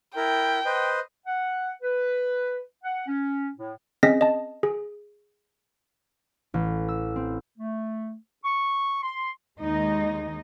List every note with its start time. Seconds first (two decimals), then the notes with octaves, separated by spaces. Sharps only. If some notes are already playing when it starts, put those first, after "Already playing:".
0.16 E4 A#4 G5
0.65 B4 C5 D#5
1.26 F#5
1.82 B4
2.84 F#5
3.07 C#4
3.56 A2
4.03 C4 C#4 G#4 D#5 A#6 B6
4.21 D#5 A5
4.63 G#4
6.54 A1
6.88 E6
7.16 C4
7.58 A3
8.44 C#6
9.02 C6
9.61 D#2 G#3 D#4 D#5